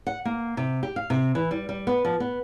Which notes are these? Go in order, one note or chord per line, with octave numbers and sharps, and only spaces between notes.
F#5
A#3
C3
G4
F5
C3
E3
G3
G3
B3
F3
B3